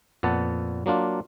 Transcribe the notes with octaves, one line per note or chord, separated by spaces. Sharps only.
F2 A#2 B3 F#5 A5
F#3 A#3 D4 F4